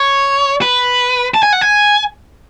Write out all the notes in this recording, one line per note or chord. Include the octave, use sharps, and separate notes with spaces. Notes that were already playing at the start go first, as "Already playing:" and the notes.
Already playing: C#5
B4
A5
G#5
F#5
G#5